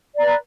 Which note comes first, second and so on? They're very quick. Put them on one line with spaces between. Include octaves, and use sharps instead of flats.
D5 A#5 B4